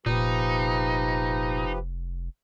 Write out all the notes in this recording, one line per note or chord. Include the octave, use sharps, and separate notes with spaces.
F1 A#2 F3 D#4 G4 B4